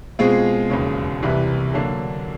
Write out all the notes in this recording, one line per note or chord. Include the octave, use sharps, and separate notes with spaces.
B2 G#3 C4 F4 G#4
E1 D#2 C#3
C2 C3 E3
D3 F#3 A#3 D4